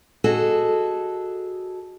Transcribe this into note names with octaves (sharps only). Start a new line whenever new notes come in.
F#4 G#4 A4 D#5